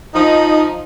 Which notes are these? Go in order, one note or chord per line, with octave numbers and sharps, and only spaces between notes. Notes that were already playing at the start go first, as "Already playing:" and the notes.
F3 D#4